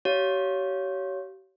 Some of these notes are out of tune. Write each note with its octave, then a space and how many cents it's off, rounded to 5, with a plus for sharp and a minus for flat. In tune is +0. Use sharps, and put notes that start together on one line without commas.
G4 -40 C#5 +10 F5 +0